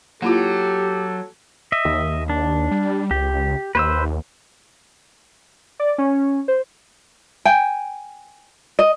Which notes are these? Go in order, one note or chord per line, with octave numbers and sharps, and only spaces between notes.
F#3 A#3 E4 F4 G4 A4
D#5 E5
D#2
D4
G3
C#2 G4
D#2 B4 C5 E6
D5
C#4
C5
G5 G#5
D#5